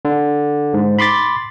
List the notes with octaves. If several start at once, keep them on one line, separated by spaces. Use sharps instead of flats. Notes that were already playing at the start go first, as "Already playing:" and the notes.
D3
G#2
B5 C6 D6 A6